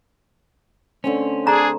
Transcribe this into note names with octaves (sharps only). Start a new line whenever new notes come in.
D3 A3 C4 C#4
D4 G#4 A#5